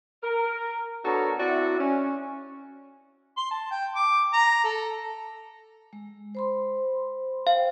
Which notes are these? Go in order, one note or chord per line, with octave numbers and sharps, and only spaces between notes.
A#4
B3 D4 F#4 A4 A#4 C#5
C4 E4 F#4 D5 E5 F#5
C#4
C6
A5
G5
D6
A#5
A4
G#3
C5 B5 C6
C5 F5 G5